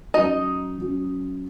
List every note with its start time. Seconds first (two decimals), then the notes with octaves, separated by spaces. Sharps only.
0.14 F#3 C#4 D#4 F#4 D#5
0.78 F#3 C#4 F#4